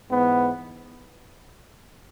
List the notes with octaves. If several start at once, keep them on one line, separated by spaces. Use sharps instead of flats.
G#2 E3 B3